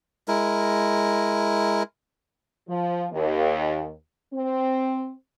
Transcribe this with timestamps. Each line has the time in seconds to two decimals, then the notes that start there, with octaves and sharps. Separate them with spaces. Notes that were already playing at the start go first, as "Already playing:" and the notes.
0.28 G#3 E4 A#4
2.67 F3
3.11 D#2
4.33 C4